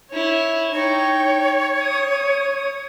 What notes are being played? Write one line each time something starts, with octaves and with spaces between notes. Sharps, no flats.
E4 C#5
D#4 C#5 G5
D#6